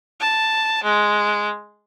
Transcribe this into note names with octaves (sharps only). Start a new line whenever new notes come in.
A5
G#3